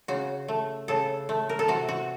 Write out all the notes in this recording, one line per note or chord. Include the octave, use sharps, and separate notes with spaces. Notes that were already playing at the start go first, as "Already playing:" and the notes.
C#3 F#4
A3
C#3 A4
A3
A#4
A4
C3 F#4
F#4